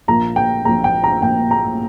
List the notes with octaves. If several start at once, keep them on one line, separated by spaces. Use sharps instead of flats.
A#1 A#2 A#3 A#5
G5
A#1 A#2 A#3 A#5
G5
A#5
A#1 A#2 A#3 G5
A#5